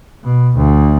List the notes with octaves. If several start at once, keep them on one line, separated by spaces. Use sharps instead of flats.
B2
D2